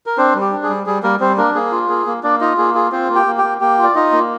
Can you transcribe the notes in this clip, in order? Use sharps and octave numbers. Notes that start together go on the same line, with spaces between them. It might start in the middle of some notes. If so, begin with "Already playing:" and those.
A#4
C4 D4 C5
G3
G4
D4
G#4
G3
G3 G#4
G3 A#3 A#4
G3 C4 C5
A#3 D4 A#4
A#3 G#4
F4
A#3 G#4
A#3
A#3 D4 D5
D#4 F4 D#5
A#3 G#4
F4 G#4
C4 F4 C5
A#3
G4 G5
A#3
G4 G5
A#3
A#3 G4 G5
F4
D5
D#4 F4 D#5
A#3